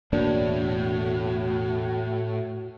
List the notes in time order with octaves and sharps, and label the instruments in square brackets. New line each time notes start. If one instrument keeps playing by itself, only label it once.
[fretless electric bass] E1 A#3 D4 [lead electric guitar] A2 [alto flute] F#4